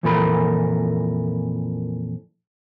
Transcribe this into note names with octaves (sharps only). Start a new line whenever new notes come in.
F2 A#2 E3 A4 A#4 B5